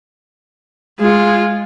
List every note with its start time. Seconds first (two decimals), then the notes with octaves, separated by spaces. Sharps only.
0.99 G#3 F4